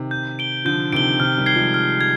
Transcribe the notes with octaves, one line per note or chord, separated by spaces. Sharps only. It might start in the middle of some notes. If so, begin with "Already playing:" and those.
Already playing: C3 D#3
G6
D7 G7
D3 F3 G6
C3 D#3 D7 G7
C3 D#3 F6
D#3 G3
G#6 C7 G7
F3 G#3
F6
G#6